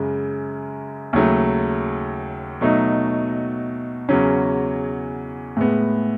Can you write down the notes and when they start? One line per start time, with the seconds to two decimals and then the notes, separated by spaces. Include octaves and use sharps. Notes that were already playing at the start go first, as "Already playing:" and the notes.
Already playing: F#2 C#3 G#3
1.13 D#2 C#3 F#3 A3
2.61 B2 F#3 A3 D#4
4.09 E2 C#3 F#3 C#4
5.57 A2 G#3 B3